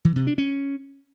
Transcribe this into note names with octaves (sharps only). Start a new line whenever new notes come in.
E3
C3
D4
C#4